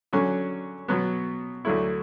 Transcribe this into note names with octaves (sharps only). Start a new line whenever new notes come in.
D3 F#3 C#4
B2 F#3 B3
D2 D3 F#3 A3 E4